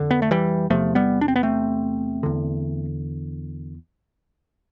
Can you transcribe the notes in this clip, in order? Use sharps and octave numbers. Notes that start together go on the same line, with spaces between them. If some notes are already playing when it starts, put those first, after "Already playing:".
Already playing: F2 D3
B3
A3
E3 G3
E2 C3 F3 A3
G3 B3
D4
C4
B3
A3 C4
E2 D3